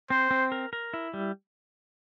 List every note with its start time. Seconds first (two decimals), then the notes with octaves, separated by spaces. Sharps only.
0.10 C4 C5
0.31 C4
0.52 A#4
0.73 A#4
0.94 E4
1.14 G3